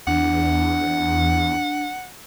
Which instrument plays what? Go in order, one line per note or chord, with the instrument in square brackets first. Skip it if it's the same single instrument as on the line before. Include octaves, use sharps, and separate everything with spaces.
[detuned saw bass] E2 [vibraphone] D4 [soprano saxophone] F#5